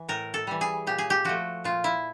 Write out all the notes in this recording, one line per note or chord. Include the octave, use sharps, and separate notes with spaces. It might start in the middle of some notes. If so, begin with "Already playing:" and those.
Already playing: E3
A2 A#4
A4
E3 G3
G#4
A#2 G4
G#4
G4
F3 A3 F#4
A#2 F4
E4